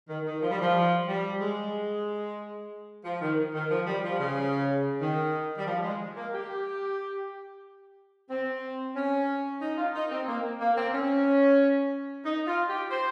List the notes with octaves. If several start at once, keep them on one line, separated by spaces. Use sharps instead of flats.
D#3
D#3
F3
G3
F3
G3
G#3
F3
D#3
D#3
F3
G3
F3
C#3
D#3
G3
F3
G#3
A#3
G4
C4
C#4
D#4
F4
D#4
C4
A#3
A#3
C4
C#4
D#4
F4
G4
C5